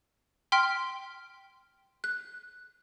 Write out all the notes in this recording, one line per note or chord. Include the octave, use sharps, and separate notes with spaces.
G5 C6 F6 B6 D7
F#6